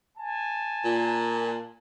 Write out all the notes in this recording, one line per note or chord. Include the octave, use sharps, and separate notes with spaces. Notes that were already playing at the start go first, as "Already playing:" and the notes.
G#5 A5
A#2